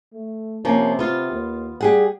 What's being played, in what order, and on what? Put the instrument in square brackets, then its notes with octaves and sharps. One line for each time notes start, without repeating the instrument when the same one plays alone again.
[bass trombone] A3
[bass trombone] C3 [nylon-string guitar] F3 A#3 C#4
[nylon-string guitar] B3 F4
[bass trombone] D#2
[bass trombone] G3 [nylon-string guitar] G4 G#4 F#5